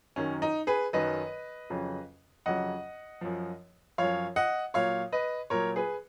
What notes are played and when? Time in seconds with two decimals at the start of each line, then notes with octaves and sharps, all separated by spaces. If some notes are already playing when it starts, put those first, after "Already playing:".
0.16 F#2 D#3 F#3 C#4
0.42 D#4
0.67 G#4 B4
0.93 F#2 D#3 F#3 B4 D#5
1.70 F2 C#3 F#3
2.46 F2 C#3 F#3 D#5 F#5
3.21 F#2 F3
3.98 F#2 F3 C#5 F5
4.36 D#5 F#5
4.74 A#2 F#3 C#5 F5
5.12 B4 D#5
5.50 A#2 F#3 A#4 C#5
5.76 G#4 B4